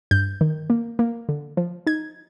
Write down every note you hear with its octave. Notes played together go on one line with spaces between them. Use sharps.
G2 G6
D#3
A#3
A#3
D3
F3
D#4 G#6